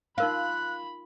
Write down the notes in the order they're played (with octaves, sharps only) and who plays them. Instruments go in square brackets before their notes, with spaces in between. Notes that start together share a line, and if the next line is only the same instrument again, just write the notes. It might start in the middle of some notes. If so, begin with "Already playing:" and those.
[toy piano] D#4 A#4 F5 [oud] F4 [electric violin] B5 [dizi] F#6